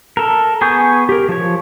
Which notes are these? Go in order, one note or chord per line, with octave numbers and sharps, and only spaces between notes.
A4 A#4
B3 G#4 G#5 C#6 G6
G4 A#4
F3 C#5